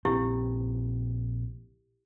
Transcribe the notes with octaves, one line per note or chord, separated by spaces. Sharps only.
A#1 C#3 C4 E4 G4